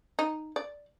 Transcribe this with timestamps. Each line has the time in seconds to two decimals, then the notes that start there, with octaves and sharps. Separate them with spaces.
0.19 D#4
0.56 D5